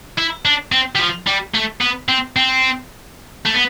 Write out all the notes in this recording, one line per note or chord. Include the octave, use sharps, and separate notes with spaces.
E4
D4
C4
G3
F3
G3
A3
B3
C4
C4
A3
B3